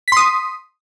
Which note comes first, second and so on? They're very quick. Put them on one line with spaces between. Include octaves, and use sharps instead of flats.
B6 C6 D#6